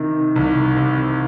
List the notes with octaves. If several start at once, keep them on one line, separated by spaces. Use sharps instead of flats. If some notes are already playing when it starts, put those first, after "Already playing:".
Already playing: C3 D#3
C2
C3